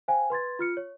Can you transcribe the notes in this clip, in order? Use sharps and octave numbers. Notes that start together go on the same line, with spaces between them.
C5 F5 G5 G#5
B4 C6 G#6 A6
F4 F6 C#7
C#5